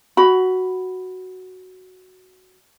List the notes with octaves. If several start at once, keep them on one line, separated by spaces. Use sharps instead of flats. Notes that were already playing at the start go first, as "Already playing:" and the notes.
F#4 B5